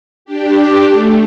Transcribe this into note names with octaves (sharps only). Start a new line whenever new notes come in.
D4 G4
A3